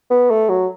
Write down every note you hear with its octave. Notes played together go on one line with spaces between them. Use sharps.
B3
A3
F#3